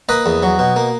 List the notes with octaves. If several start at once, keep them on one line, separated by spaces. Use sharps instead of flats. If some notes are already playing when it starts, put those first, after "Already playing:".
A#3 B4 D#5
E2
F#3
B2
A#3